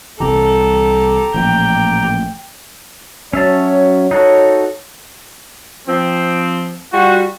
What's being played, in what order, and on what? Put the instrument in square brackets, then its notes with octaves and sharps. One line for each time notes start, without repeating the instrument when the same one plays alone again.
[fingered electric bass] C2 C3 E3 [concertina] G4 A#5 [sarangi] A4
[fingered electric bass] A1 A#2 F3 [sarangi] G5
[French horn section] F#3 C#5 [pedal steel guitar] C#4 E5 A5
[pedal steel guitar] D#4 F#4 A4 [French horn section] C#5
[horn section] F3 C4
G3 F4 F#4